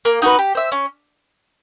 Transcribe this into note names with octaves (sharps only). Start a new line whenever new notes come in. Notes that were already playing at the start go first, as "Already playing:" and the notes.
A#3
D#4 F#4 B4
G4
C5 E5
C#4